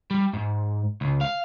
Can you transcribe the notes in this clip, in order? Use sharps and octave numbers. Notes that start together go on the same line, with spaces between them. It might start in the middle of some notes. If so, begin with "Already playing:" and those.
G3
G#2
C#2
F5